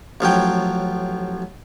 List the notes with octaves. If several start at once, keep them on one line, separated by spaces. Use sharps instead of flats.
A1 F3 F#3 G5